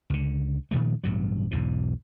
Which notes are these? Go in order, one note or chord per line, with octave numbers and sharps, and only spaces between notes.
C#2 D3
A#2 D#3 F3 A3
A1 G2 B2 F#3
B1 E2 G#2 B2